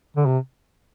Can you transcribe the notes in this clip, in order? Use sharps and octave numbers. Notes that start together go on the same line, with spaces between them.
D3
C3